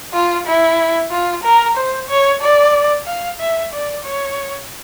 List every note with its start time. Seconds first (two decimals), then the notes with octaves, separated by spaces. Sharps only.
0.14 F4
0.47 E4
1.11 F4
1.44 A#4
1.76 C5
2.09 C#5
2.41 D5
3.06 F5
3.40 E5
3.72 D5
4.04 C#5